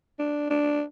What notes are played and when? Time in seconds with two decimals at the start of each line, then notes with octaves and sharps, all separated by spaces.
0.19 D4
0.50 D4